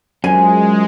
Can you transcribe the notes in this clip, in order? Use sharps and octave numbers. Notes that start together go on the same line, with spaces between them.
F#2 G#3 F4 C5 G#5